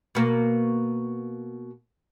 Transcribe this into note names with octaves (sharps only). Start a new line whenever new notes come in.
B2 A#3